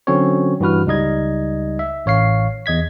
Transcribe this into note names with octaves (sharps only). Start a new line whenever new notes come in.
D3 F#3 C4 C#4 F#4 C#5
G2 E3 F#4 B4 F6
C#2 G3 D#4 D#5 G#6
E5
A1 C#5 F5 C7
E2 D#5 G#6 B6